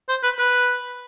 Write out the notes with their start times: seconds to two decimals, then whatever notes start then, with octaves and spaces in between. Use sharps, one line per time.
0.09 C5
0.23 B4
0.38 B4